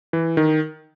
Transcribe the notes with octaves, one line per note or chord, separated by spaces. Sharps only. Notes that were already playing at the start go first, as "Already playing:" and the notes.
E3
D#3